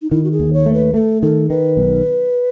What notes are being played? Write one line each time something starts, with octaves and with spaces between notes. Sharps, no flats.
D#4
D#3 E4
F#4
G#4
D#2
C#5
A3
B4
A3 A4
D#3 A4
D#3 B4
B1